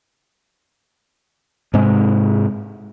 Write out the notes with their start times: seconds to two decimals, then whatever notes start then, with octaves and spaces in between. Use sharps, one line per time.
1.74 G#2 C3 G#3